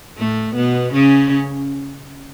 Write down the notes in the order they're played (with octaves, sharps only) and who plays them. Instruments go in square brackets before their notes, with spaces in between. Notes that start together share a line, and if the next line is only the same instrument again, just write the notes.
[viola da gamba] A2 A3
B2 B3
C#3 C#4